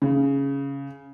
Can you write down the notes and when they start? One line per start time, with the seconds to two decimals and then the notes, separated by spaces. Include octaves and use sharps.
0.02 C#3